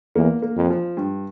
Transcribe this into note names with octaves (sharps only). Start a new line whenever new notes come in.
E2 A#3
A#3
F2
F3
G2